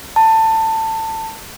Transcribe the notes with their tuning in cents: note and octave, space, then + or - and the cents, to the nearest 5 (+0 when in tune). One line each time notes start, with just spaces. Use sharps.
A5 +20